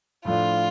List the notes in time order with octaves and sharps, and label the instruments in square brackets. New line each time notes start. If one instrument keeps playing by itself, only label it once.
[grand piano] A2 F3 A3 D4 [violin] F4